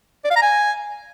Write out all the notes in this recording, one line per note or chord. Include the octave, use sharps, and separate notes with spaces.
D5
F5
A#5
G#5